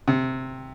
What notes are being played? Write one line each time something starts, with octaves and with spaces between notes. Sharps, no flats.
C3